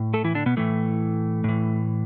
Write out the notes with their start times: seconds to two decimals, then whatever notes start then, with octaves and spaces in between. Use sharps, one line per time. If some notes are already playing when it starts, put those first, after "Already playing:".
Already playing: A2
0.14 A3 A4
0.24 E3 E4
0.35 D3 D4
0.46 B2 B3
0.57 A2 E3 A3
1.44 A2 E3